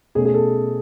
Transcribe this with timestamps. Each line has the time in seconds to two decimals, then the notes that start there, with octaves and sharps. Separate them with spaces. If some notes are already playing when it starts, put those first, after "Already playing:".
0.15 B2 A3 C#4 G#4
0.25 G#4
0.34 A4